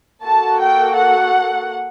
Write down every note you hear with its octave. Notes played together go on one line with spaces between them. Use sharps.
A#3 F#4 A4 A5
G5
F#5